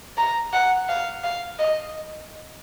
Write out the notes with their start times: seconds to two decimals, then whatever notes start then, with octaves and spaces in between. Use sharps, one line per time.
0.18 A#5
0.53 F#5
0.89 F5
1.24 F5
1.59 D#5